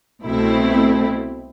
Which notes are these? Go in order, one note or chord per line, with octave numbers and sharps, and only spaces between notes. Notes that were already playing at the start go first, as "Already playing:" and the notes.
C2 B2 A3 C4 E4